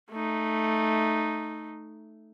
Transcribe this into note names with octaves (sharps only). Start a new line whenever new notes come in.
A3 D#4